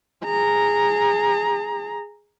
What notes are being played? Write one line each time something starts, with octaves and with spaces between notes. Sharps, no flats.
G#4 A#5